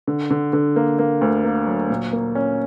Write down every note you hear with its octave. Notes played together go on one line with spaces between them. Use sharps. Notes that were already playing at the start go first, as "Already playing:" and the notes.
D3
D3
D3
A#3
A#3
D2
A#3
F#3
A#2
A#3
C#4